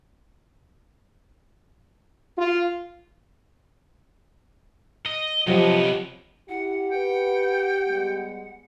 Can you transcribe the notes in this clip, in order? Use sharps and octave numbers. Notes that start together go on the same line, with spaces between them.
F4
D#5
C3 F3 F#3 B3 G4 D#5
E4 G4 F#5
B4 G5
G3 G#3 B3